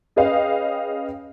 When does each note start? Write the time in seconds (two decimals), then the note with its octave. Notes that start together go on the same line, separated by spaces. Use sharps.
0.16 C#4 G#4 B4 D#5 F5 G5